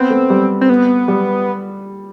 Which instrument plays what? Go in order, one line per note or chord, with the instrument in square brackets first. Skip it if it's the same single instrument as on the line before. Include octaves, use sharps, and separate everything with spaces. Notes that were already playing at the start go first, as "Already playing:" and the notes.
Already playing: [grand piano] B3 [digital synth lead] C4
[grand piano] A3
G3
[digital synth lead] C4
B3
[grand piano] G3